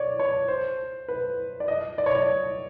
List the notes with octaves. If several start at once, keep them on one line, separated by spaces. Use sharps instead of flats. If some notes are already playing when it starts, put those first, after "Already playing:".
Already playing: C#5 D5
C#5
C5
B4
D5
D#5
D5
C#5
D5